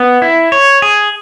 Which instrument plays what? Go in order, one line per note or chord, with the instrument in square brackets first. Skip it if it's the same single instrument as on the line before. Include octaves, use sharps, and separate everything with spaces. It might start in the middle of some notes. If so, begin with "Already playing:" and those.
Already playing: [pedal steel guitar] B3
E4
C#5
G#4